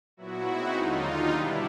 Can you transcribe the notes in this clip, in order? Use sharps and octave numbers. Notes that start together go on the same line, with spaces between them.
A#2 F#3 B3 E4 F#4
B2 G#3 C4 D#4
D#2 D3 F#3 D#4 F4
D#2 D3 G3
B2 G3 B3 D4 E4